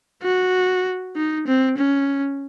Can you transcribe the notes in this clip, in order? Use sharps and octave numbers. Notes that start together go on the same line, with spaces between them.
F#4
D#4
C4
C#4